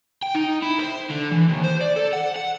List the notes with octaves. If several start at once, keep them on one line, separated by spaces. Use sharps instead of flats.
G5
D#4
E4
C5
D3
E3
D#2
C5
D5
A4
F#5
F#5